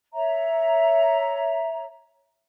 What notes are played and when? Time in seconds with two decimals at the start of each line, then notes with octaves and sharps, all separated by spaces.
0.13 C#5 E5 A#5